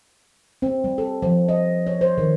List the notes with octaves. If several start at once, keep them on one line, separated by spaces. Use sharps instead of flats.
C4
G3
A4
F3
D#5
C#5
C5
D#3